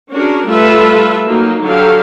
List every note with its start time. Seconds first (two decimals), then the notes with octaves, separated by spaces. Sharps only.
0.10 C#4 D4 F#4 G#4 A#4
0.46 G3 A3 F4 A4 B4 E5
1.26 F#3 A#3 D#4
1.64 D3 F#3 G4 A4 F5